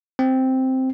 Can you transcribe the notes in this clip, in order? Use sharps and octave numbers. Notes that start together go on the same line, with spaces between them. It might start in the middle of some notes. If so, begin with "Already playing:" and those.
C4